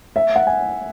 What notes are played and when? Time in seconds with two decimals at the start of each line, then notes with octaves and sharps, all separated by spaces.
0.16 E5
0.36 F#5
0.47 G#5